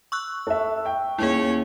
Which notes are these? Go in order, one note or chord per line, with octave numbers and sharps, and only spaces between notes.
C#6 E6 F#6
A4 E5
G5
D#2 C#4 E4 G#4 C#5